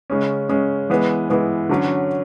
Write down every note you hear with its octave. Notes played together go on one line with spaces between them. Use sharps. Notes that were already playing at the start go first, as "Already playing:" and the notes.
C#3 G#3 C#4
C#3 G#3 C#4
E3 G#3 B3
E3 G#3 B3
D3 F#3 C#4